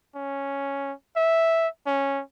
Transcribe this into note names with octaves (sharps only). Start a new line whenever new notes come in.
C#4
E5
C#4